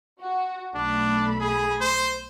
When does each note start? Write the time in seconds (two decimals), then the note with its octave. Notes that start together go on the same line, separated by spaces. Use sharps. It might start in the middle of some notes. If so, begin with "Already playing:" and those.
0.21 F#4
0.75 B1 A3 D4 B5
1.40 G#4
1.81 C5